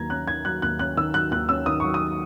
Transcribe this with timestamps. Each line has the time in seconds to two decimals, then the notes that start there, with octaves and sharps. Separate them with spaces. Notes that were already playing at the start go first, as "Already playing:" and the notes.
Already playing: D#2 D#3 F#3 A#5 G#6
0.10 C#4 F#6
0.27 D#3 G#6
0.45 F#3 F#6
0.62 D#2 F#6
0.79 C#4 F#6
0.97 D#3 E6
1.14 F#3 F#6
1.31 D#2 F#6
1.49 C#4 E6
1.66 D#3 D#6
1.80 F#3 C#6
1.94 D#6